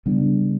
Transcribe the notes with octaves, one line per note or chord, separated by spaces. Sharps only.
C#3 G3 B3 D4